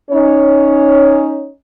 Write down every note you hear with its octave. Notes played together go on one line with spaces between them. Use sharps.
C#4 D#4 C#5